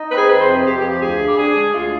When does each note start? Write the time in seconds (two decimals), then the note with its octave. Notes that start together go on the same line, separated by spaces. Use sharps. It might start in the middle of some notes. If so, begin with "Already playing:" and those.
Already playing: D#4
0.10 C4 B4
0.17 G#4
0.29 F2 B4
0.41 C5
0.47 C3
0.53 G#4
0.65 F2 G4
0.77 G4
0.82 F3
0.89 G4
1.01 D2 G#4
1.19 D3
1.28 G4
1.37 D4 G#4
1.55 G#3
1.73 D2 F4